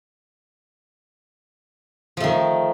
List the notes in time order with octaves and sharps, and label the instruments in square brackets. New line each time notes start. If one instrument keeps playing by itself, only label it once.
[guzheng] F3
A3
D#3